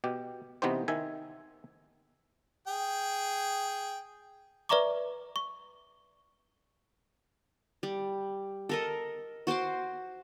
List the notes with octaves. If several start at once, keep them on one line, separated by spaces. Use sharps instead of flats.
B2 G4
C3 E3 B3 D#4 G4 C5
D#3 E5 G#5
G#4 G5
B4 D5 E5 A#5 C#6 D6
C#6
G3
A4 A#4 D#5
F#4 C5 C6 D6